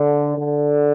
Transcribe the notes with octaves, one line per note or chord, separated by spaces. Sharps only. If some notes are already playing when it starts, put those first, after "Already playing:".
Already playing: D3
D3